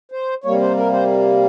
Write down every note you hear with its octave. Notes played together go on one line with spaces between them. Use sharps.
C5
C3 G3 A#3 C#5
C5
A#4
C5